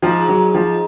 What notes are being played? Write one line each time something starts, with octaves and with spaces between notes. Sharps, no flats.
G#2 F3
F#3
F3